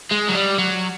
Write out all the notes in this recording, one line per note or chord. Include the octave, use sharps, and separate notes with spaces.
G#3
F#3
G3
F#3